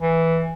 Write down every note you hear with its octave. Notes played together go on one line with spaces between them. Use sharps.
E3